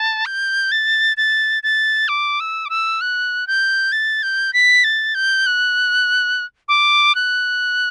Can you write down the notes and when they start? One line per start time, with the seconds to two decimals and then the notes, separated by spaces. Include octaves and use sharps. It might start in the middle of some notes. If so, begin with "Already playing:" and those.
Already playing: A5
0.26 G6
0.72 A6
1.17 A6
1.63 A6
2.08 D6
2.40 E6
2.65 D6
2.70 E6
3.01 F#6
3.47 G6
3.92 A6
4.23 G6
4.53 B6
4.84 A6
5.15 G6
5.46 F#6
6.68 D6
7.15 F#6